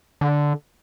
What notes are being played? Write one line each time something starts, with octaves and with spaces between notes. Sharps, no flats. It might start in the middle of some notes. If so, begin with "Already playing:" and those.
D3